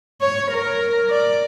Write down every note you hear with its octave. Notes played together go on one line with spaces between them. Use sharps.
C#5
A#4
D5